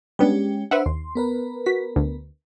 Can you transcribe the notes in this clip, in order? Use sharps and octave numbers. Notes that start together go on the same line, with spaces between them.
G3 G#3 B3 C#4 D4 G4
D4 B4 C5 E5 F#5
D#2 C6
B3 A#4 B4
F#4 B6
D2